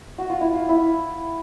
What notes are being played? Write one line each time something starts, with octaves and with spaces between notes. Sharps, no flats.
F#4
F4
E4
F4
E4